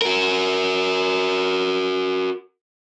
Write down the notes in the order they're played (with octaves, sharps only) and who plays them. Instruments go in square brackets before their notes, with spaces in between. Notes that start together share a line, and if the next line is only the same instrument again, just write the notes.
[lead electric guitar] F#4 A#4